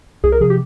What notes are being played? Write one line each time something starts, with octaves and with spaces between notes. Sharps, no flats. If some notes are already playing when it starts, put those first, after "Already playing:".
C2 G#4
A#4
C3 F3 G#4
G4